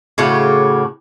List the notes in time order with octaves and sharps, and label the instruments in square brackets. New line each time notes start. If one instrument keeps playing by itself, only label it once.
[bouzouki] A2 C#3 F#4 G4